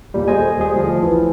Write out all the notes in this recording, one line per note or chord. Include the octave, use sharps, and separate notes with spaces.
D#2 A#2 G3
G#4 A4 C5 D#5 G#5
D#2 G3 G#4
D2 F3
A#1 E3 F3